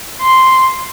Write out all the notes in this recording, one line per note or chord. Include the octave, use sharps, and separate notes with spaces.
C6